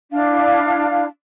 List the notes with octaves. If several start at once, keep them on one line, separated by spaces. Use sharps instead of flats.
D4 E4 F5